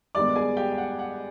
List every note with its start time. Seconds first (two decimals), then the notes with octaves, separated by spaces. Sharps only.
0.15 G2 D#3 G#3 B3 D5 D6
0.36 G#4 G#5
0.57 G4 G5
0.72 G5
0.78 F#5
0.99 F#5